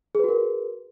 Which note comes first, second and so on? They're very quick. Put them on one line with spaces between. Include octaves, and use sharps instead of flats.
G#4 B4 F#4 A#4